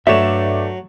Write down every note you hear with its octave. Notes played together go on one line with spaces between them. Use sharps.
G2 F#3 A3 C#5 D5 E5 E7